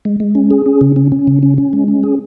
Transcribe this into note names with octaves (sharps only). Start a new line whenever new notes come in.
G#3
G#3
C#4
G#4
C#4
C#3
C#4
C#4
C#3
C#4
C#4
G#3
C#4
G#4